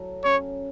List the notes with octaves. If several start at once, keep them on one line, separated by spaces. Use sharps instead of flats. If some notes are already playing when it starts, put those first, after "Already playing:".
Already playing: F#3 F#4 A4
C#4 C#5